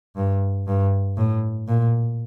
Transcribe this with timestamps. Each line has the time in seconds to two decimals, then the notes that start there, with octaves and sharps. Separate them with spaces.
0.16 G2
0.67 G2
1.17 A2
1.68 A#2